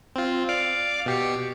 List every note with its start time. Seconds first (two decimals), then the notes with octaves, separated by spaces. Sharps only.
0.16 C4 F4
0.49 D5 F5 D6
1.06 B2 G4 C#7